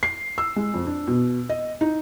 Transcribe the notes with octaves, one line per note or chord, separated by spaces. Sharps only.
C7
E6
G#3
F2
D4
B2
D#5
D#4